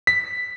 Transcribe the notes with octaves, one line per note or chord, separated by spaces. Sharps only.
B6